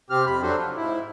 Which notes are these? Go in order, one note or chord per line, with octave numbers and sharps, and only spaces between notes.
C3 C4 G4 F6
F2 B5
F#3 D4 F#4 A4 C5
F4
G#2 E4